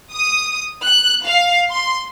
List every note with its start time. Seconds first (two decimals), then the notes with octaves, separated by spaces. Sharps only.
0.12 D#6
0.84 F#6
1.23 F5
1.70 C6